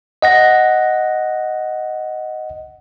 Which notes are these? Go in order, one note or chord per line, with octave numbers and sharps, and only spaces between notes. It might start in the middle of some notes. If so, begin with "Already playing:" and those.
D#5 F#5 A#6